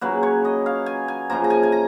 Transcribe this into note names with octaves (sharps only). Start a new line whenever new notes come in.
C#3 F#3 A#3 B4
C#5
D#5
F5
G#5
G#5
F#2 C#3 F3 A#3 A#5
A#5
G#5
G#5
A#5